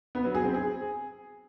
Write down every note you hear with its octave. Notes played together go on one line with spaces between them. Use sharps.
B3
F#3
G#4
C4
G#4